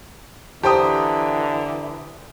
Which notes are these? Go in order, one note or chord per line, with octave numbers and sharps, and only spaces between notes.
D3 E3 G4 C5 G5 A5 A#5 D#6